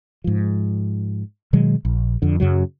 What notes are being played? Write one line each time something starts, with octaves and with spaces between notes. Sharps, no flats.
G#2 F3
B2 D#3 F#3 G#3
A#1
F2 D3
F#2 C#3 F#3